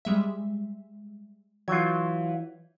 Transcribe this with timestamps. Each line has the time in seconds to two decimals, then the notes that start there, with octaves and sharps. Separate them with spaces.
0.05 G3 G#3 E5
1.68 E3 F#3 F4 G6 G#6